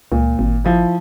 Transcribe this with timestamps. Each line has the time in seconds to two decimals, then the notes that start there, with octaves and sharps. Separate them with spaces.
0.12 C#2 A#2
0.39 G#1
0.64 F3 E4